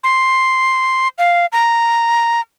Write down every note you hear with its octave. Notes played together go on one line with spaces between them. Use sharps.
C6
F5
A#5